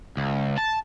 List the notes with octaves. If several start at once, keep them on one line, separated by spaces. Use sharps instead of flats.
C#2
A5